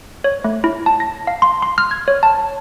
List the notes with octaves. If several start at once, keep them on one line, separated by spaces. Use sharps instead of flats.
C#5
A3
E4
A5
A#6
F5
C6
C6
F6
G#6
C#5
A5